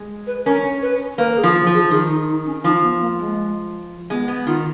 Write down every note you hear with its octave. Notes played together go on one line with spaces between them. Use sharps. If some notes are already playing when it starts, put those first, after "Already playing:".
Already playing: G#3
B4
C#4 A#4
B4
A#3 B4
A#4
G#4
F3
F3
G#4
D#3 G#4
D#4
D#4
C#4
F3 D#4
B3
A#3
G#3
G#3 B3
B3
D#3 F4